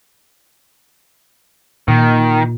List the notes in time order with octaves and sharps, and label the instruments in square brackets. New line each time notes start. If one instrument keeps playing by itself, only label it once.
[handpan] A#2 [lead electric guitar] D#3